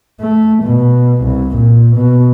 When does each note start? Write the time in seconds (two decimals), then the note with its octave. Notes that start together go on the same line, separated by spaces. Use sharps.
0.20 A3
0.63 B2
1.23 C2
1.56 A#2
1.96 B2